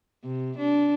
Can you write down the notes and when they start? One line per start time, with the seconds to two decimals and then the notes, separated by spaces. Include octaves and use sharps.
0.24 C3
0.58 D4